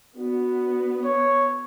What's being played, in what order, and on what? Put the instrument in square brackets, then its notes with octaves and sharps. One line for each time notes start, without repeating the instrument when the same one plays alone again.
[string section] B3 [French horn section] D4 F#4
[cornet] C#5